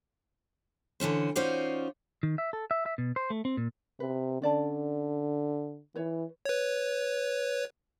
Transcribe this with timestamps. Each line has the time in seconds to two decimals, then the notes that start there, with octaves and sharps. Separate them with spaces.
1.00 D3 E3 C#4 C5
1.36 C#4 D#4 F4 F#4 C5 D5
2.23 D#3
2.38 E5
2.53 A4
2.71 E5
2.86 E5
2.98 B2
3.16 C5
3.30 A3
3.45 C4
3.57 A#2
4.00 C3 B4
4.42 D3 C#4 D5 A5
5.96 E3 B4 C#5
6.45 B4 C#5